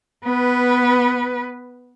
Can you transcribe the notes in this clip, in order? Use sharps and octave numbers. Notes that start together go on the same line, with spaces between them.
B3 B4